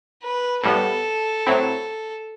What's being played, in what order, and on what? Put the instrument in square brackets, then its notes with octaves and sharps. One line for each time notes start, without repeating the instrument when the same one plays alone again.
[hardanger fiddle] B4
[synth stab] A2 G3 B3 [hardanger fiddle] A4
[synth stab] A2 F#3 C4 E4